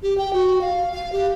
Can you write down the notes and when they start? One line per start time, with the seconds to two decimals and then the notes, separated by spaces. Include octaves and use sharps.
0.03 G4
0.18 G5
0.33 F#4
0.61 F5
0.92 F5
1.13 G4